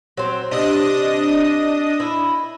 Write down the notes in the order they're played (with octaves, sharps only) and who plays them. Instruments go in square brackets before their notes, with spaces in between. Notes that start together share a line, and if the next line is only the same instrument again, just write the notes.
[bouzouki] F#3 C4
[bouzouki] C3 [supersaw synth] D4 D#5 D#6
[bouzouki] E4